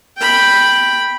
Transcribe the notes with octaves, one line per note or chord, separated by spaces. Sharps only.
G5 B5